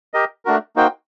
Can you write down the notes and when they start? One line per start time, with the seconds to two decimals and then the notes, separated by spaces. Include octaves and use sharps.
0.14 G4 A#4 D#5
0.45 A3 D4 F#4 A#4
0.76 A#3 D#4 F#4 C5 G5